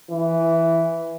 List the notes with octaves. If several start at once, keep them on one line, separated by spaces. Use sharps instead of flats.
E3